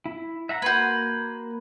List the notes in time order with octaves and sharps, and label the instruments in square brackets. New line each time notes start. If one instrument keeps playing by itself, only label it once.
[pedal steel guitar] E4
E5 F#5 A#5
[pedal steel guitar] A#3 C6 [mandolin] F#4 B4 [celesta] G6 G#6